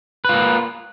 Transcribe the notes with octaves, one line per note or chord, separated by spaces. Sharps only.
A#3 F4 B4